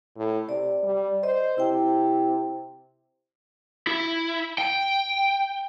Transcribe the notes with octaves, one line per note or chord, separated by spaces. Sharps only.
A2
C3 D5
G3
C5 D#5
C3 E4 C5 G5
E4
G5